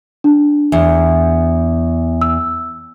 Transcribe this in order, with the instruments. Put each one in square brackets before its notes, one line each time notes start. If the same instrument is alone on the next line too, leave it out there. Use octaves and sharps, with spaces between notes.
[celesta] D4
[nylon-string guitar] E2
[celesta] E6